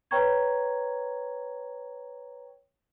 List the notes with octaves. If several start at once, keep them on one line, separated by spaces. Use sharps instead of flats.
B4 C#5 G5 A#5 C#6 G#6